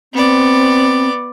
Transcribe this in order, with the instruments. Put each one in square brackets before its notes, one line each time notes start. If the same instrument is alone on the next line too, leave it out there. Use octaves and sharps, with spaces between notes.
[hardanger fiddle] B3 D5 [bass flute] C4